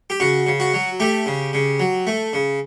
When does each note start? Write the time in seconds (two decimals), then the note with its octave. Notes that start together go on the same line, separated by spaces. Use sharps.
0.10 G4
0.20 C#3 F#4
0.47 C#3
0.60 F#4
0.74 F#3
1.00 A3 G4
1.26 C#3
1.53 C#3
1.80 F#3
2.07 A3
2.33 C#3